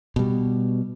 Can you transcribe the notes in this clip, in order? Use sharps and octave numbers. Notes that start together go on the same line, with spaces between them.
B2 G3